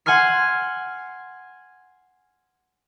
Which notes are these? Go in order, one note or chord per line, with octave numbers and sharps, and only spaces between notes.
F#5 G#5 C6 F6 C7